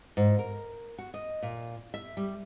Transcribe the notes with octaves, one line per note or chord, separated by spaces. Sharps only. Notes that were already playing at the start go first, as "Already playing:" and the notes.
G#2
A#4
F#4
D#5
A#2
E5
G3